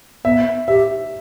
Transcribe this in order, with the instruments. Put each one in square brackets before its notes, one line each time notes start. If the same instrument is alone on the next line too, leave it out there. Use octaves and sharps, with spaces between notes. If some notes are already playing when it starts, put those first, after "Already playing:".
[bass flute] B3 [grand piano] E5
[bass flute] G4 [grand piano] E5